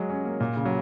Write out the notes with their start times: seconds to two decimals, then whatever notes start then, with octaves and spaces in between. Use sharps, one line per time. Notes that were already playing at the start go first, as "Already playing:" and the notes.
Already playing: F#3 G#3
0.10 C#4
0.25 A#3
0.40 A#2
0.56 C#3
0.65 F#3